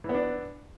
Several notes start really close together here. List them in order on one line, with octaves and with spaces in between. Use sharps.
E3 B3 D4